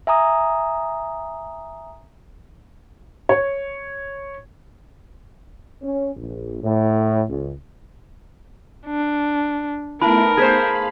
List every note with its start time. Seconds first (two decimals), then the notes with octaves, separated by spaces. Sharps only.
0.07 E5 G#5 A#5 D#6
3.29 C#5
5.82 C#4
6.15 A#1
6.61 A2
7.28 C#2
8.86 D4
10.02 A3 B3 D#4 E4 A#4 A5 B5
10.37 G#4 B4 C5 F5 B5 G#6 B6